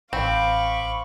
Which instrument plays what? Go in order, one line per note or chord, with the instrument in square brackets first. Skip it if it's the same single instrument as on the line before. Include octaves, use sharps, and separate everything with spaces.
[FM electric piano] A1 [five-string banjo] C4 [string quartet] F5 D6 [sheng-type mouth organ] B5 C#6